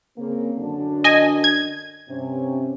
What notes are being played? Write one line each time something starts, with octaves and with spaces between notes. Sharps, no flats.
C#3 A#3 C4
F#2 D3 D4
D#5 G#5
G#6
G2 C3 C#4